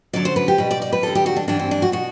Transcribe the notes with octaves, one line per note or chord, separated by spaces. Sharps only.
F#2 D3 F#3 D5
C5
B4
G4
B2 G3 B4
D5
D5
B4
E2 D3 G3 A4
G4
F#4
D4
G2 E3 G3 D4
C4
D4
F#4
B2 F#4